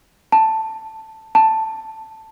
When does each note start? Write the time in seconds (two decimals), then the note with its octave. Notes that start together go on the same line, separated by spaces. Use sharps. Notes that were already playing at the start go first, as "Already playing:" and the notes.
0.32 A5
1.35 A5